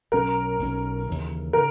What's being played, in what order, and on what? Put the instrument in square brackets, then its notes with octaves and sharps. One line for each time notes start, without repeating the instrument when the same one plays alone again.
[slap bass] B1 B2 F#3 C#4 [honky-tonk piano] A#4
[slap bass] B1 B2 F#3 C#4
D#2 C#3 E3
[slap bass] C#3 [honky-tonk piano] A#4